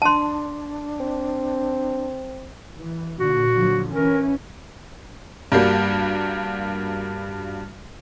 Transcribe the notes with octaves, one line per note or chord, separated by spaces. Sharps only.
D4 A5 C6
C4
E3
A#2 D3 F#4
D3 F3 F#3
E3 C#4 A#4
G2 G3 A#3 F#4